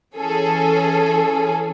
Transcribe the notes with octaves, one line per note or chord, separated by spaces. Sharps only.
E3 C#4 G#4 A4